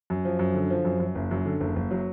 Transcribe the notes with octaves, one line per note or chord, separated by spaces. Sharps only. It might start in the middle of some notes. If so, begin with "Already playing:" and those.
F#2
F3
F#2
D3
F3
F#2
F#2
F#1
F#2
D3
F#1
F#1
F#3